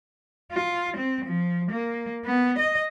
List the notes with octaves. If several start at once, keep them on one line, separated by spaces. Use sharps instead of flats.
F4
C4
F3
A#3
B3
D#5